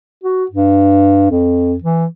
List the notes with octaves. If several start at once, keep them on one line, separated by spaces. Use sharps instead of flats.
F#4
G2
F2
E3